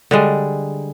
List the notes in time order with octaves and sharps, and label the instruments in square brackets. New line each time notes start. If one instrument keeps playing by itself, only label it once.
[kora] D3 G3 G#3